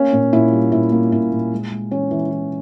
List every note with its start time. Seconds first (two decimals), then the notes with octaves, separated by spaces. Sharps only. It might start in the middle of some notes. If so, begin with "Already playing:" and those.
Already playing: A#3 C#4
0.13 A#2
0.33 A#2 E4
0.53 G3
0.72 A#2 E4
0.92 A#3
1.12 A#2 E4
1.32 A#2
1.52 G#3
1.71 G#3
1.91 E3 C#4
2.11 E3
2.31 E3